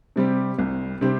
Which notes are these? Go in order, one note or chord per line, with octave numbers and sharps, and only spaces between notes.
C3 G3 C4 G4
C2
C3 G3 C4 G4